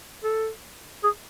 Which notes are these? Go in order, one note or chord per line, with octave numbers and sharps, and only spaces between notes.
A4
G#4